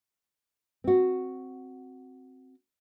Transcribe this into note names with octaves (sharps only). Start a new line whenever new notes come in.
C4 F#4